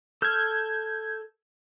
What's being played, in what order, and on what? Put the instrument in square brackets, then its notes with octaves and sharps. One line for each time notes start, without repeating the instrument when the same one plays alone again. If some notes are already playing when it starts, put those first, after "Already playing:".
[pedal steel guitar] A4 F6 [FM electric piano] G6 G#6